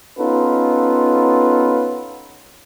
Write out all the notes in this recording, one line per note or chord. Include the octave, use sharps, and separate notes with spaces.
B3 C#4 D#4 F4 A4 B4